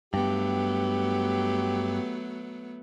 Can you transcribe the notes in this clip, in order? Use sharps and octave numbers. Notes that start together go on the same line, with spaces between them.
G2 F#3 A3 B3 G4